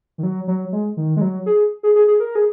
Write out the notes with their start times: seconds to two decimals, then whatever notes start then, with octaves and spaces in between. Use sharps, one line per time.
0.18 D#3
0.23 F#3
0.48 F#3
0.72 G#3
0.97 D#3
1.17 G#3
1.21 F#3
1.46 G#4
1.83 G#4
1.95 G#4
2.08 G#4
2.20 A#4
2.35 G#4